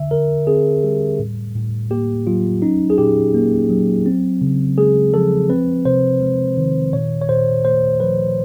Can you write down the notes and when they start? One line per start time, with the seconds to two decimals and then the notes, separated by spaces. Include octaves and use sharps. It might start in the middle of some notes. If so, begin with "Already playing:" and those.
Already playing: D3 E5
0.11 D3 A#4
0.47 C4 G#4
0.84 G3 G4
1.19 A2
1.55 A2
1.91 A#3 G4
2.27 F#3 F4
2.62 C#4 D#4
2.90 G#4
2.98 A#2 G4
3.34 A#3
3.70 F#3
4.06 C4
4.41 C#3
4.78 G#3 G#4
5.14 F3 A4
5.50 C4 B4
5.85 C3 C5
6.21 G#3
6.57 D#3
6.93 A#2 C#5
7.22 C#5
7.29 A#2 C5
7.65 A3 C5
8.00 F3 B4